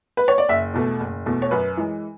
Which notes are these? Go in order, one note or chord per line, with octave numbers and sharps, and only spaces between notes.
B4
C#5
D5
F#1 E5
E2 B2 A3
F#1
E2 B2 A3
C#5
F#2 B4
E3 G#3